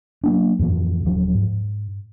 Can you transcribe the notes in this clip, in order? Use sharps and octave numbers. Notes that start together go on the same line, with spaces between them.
F#3 A#3 D4
F2 A2 E3 F3
D#1 F3 F#3
G#2